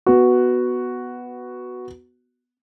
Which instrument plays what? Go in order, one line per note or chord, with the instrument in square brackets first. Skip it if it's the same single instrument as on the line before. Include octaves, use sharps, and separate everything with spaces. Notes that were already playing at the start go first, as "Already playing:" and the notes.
[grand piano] B3 F#4